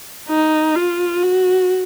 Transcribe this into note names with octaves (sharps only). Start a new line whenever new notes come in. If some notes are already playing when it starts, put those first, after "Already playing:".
D#4
F4
F#4